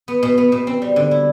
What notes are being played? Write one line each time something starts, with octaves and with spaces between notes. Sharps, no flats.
B3
B2
B3
B2
C4
G3
D3
E4